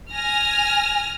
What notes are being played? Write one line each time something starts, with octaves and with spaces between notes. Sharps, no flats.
G#5 F6 A#6